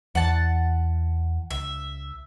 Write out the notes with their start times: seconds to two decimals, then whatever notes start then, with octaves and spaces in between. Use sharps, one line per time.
0.15 E2 F#5 A5
1.50 C#2 E5